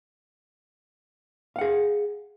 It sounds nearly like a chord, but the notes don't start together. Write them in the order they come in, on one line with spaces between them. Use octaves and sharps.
F5 F#5 G#4